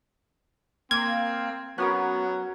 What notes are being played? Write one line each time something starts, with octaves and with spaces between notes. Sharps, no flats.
A#3 C4 G#6
F#3 B3 C#4 F#4 A#4